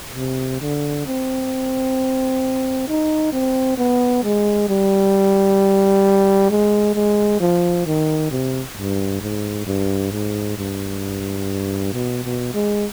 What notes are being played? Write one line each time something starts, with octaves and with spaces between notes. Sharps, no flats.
C3
D3
C4
D#4
C4
B3
G#3
G3
G#3
G#3
F3
D#3
C3
G2
G#2
G2
G#2
G2
B2
B2
G#3